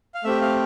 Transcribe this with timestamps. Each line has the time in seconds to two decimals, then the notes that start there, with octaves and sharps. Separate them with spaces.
0.15 F5
0.24 A3 C4 G4 E5
0.42 F5